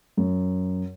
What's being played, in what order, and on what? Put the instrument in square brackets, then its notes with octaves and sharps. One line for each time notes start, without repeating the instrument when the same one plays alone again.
[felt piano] F#2